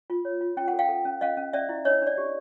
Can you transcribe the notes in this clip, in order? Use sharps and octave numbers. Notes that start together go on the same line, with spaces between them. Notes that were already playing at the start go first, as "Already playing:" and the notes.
F4
C#5
F4
C#4 G5
F#5
A4
F5 G5
A4
C#4
C#4 D#5 F5
C#4
C#4 D5 E5
E4
D4 C#5 D#5
D4 D5
G4